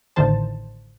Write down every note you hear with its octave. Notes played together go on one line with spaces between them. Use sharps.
A1 A2 D3 D#3 C5 A5